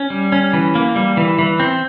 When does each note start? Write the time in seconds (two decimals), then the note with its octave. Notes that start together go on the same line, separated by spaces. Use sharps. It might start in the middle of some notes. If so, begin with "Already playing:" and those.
Already playing: C#4
0.10 G3
0.32 C#4
0.53 E3
0.75 A#3
0.96 G3
1.17 E3
1.39 E3
1.60 C4